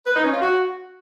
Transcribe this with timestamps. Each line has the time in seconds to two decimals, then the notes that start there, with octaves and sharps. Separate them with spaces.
0.06 B4
0.15 D#4
0.24 C#4
0.32 F4
0.41 F#4